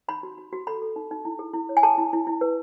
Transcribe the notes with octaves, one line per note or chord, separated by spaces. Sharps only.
D#4 B5
F#4
F#4
F#4
A4 B5
A4
D#4
D#4
E4
G#4
E4
C#5
G#5
G#4 A5
E4
E4
E4
B4